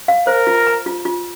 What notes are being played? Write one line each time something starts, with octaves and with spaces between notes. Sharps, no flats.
F5
A#4 C5
F4
A#5
F4
F4